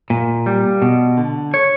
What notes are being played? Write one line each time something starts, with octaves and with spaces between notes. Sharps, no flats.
A#2
G3
B2
D3
C#5